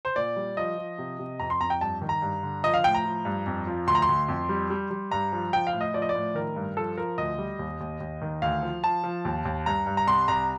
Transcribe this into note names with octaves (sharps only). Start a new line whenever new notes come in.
C5
A#2 D5
G3
F3 D#5
F3
C3
C3
F2 A#5
C6
F2 A#5
G5
G2 A5
D#3
A#5
G2
D3
F3 D#5
F5
A2 G5
A#5
F3
G2
F2
F3
D2 C6
A#5
C6
D2
F2
G3
G3
G3
G2 A#5
F3
F3 G5
F5
A2
D#5
F3 D5
D#5
D5
A2
D#3 A#4
G2
F3 A4
F3 A#4
D2 D#5
G3
D#2
D#2
D#2
D#3
D2 F5
F3
F3 A5
F3
D#2
D#2
G2 A#5
G2
A#5
C2 C6
C2 A#5